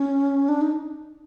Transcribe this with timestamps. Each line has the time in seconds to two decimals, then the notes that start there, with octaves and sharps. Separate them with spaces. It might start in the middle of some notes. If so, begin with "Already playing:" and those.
Already playing: C#4
0.48 D4
0.61 D#4